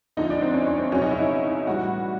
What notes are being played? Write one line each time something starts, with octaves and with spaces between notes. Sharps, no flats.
D2 D3 F3 D#4
D4
C4
C#4
C#4
C4
C#2 B2 F#3 C#4
D#4
E4
D#4
A2 E3 G3 F#4